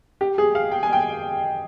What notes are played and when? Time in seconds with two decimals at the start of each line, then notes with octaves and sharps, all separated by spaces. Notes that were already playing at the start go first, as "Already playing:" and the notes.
0.21 G4
0.38 G#4
0.55 F5
0.72 G5
0.83 G#5
0.93 G5